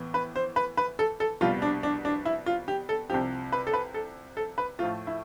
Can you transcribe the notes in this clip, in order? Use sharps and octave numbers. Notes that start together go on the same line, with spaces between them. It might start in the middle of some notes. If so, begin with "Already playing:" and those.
Already playing: A2 E3 B3
B4
C5
B4
B4
A4
A4
C2 B2 G3 F4
D4
D4
D4
E4
F4
G4
A4
C2 C3 F3 G4
B4
A4
B4
A4
A4
B4
A2 F3 A3 F4
E4